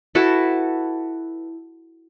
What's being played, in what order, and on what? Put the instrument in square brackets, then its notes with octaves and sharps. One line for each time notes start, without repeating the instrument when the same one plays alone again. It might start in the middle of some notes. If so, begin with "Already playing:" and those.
[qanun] E4 F#4 A4 B4